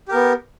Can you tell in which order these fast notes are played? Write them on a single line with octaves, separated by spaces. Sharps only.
G4 A#4 B3